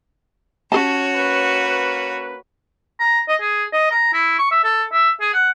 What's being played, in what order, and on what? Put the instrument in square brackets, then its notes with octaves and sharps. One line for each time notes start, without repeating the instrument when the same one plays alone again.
[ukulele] C#4 G#4 A5 [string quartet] F#4 C#5
[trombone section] A#3 B4
[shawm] A#5
D#5
G#4
D#5
A#5
E4
C#6
E5
A4
E5
G#4
F#5